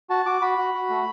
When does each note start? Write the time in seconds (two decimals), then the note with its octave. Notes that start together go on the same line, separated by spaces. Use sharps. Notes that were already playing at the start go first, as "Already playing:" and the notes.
0.10 F#4 A5
0.26 F#4 D6
0.42 F#4 B5
0.58 F#4
0.74 F#4
0.90 A3